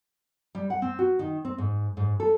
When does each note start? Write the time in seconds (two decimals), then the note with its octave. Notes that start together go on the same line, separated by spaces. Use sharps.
0.55 G3
0.70 F#5
0.82 C4
0.99 F#4
1.19 D#3
1.45 C4
1.58 G#2
1.97 G#2
2.20 A4